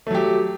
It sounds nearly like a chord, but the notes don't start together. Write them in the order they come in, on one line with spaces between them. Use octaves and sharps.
A3 F#3 G4